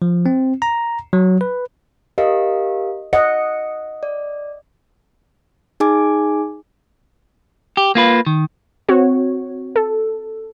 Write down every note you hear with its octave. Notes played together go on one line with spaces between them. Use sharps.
F3
C4
A#5
F#3
B4
G4 A#4 D#5 F5
D#5 F#5 C#7
D5
D#4 G#4 G#5 D6
G4
A#3 F4 B4
D#3
C4 F#4 C#5
A4